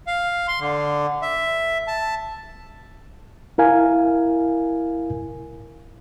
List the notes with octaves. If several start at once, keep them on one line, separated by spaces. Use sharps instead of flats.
F5
C6
D3
E5
A5
E4 A#4 F5 G#5